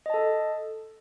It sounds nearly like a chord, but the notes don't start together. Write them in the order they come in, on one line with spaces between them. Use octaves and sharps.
D#5 A5 A4